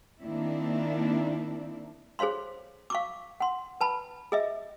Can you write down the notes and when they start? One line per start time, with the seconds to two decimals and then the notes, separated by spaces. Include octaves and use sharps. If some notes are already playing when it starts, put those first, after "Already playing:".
0.22 D#3 A#3 C4 D4 E4
2.19 G#4 C5 C#5 F5 C6
2.90 F5 C#6 D6
3.40 F#5 C6
3.81 B4 A5 B5
4.32 G#4 D#5 E5